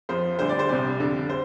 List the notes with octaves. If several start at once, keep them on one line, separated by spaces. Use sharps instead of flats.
F2 F3 C5
D2 D3 G3 C5
D5
C5
C2 C3 G3 D5
F2 D3 G3
C5